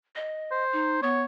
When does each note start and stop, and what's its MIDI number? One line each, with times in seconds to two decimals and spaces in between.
0.15 0.64 75
0.52 1.01 72
0.73 1.02 63
1.02 1.24 59
1.02 1.24 73